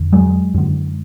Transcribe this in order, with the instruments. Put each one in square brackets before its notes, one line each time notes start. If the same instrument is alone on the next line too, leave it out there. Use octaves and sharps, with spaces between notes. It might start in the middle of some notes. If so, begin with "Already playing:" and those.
Already playing: [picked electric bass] F2 D3
F#3 G#3
F#2 D3